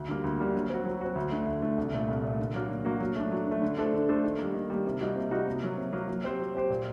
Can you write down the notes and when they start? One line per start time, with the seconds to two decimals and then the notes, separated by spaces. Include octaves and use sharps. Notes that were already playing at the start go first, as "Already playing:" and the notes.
Already playing: D2
0.08 D3 G3 A#3
0.24 D2
0.40 D3 G3 A#3
0.55 F#3
0.70 C4 F#4
0.85 F#3
1.01 C4 F#4
1.15 D2
1.31 D3 A3
1.46 D2
1.62 D3 A3
1.78 C2
1.93 A#2 A3
2.08 C2
2.23 A#2 A3
2.39 D3
2.54 F#3 A#3 F#4
2.69 D3
2.85 F#3 A#3 F#4
3.00 F#3
3.15 A3 D4
3.32 F#3
3.47 A3 D4
3.62 D3
3.78 A3 D4 A4 C5
3.93 D3
4.09 A3 D4 A4 C5
4.24 D#3
4.38 G3 A#3
4.54 D#3
4.70 G3 A#3
4.85 C3
5.01 G3 A#3 D#4 F#4
5.16 C3
5.31 G3 A#3 D#4 F#4
5.46 C3
5.62 F#3 A#3
5.77 C3
5.93 F#3 A#3
6.08 F#3
6.24 C4 G4 C5
6.40 F#3
6.55 C4 G4 C5
6.70 A#2